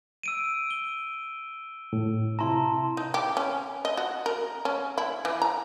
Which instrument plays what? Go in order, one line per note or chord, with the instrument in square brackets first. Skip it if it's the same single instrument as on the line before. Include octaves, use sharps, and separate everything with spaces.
[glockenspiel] E6 D7 D#7
G7
[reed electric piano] A2
[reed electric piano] C3 E4 A#5 [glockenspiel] A5 C6
[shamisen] D#4
G4
C#4
D#5
F#4
A#4
C#4
E4
E3
A#5